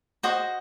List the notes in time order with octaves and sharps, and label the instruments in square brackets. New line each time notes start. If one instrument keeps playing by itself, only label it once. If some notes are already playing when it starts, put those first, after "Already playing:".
[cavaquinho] F#4 C5 D#5